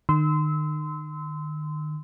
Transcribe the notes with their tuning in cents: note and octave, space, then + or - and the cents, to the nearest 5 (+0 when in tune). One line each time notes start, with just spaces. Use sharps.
D#3 -35 C6 -25 E6 -25